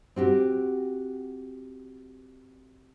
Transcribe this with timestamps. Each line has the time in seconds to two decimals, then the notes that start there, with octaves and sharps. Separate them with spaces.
0.16 C4 F#4 G4